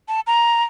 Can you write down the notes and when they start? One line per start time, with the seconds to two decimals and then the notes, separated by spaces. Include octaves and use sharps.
0.08 A5
0.27 A#5